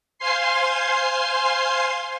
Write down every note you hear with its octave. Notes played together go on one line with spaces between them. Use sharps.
C5 F5 G#5 C6 C7